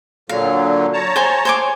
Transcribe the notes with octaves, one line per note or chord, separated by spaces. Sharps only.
A#2 D3 F#3 F5
C#5 A5 A#5
C5 G#5
C5 C#5 G#5 D6